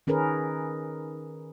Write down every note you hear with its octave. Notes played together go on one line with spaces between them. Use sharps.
D#3 C#4 G#4 A#4 B4